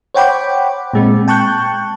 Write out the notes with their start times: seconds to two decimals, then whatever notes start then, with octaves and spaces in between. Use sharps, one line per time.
0.14 C5 C#5 F#5 G5 B5 D6
0.93 A#2 G#3 C4
1.28 G5 A5 C#6 F#6 G6